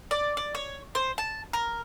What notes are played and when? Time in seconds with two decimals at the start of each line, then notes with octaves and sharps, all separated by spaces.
0.11 D5
0.37 D5
0.55 C#5
0.95 C5
1.18 A5
1.53 A#4